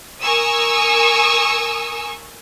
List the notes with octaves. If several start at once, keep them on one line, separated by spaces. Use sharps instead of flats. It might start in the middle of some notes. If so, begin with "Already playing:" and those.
A#4 G#5 C#6 D#6 E6